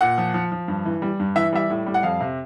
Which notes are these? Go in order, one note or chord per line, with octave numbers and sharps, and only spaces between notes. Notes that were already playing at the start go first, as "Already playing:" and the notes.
A#2 F#5
F3
F3
F3
G2
E3
G3
G2
E3 E5
G3 E5
A2
G3
F#5
F2 F5
C3